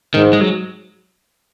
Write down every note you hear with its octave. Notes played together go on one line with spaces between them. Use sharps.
G#2 D#3
G#3
F#3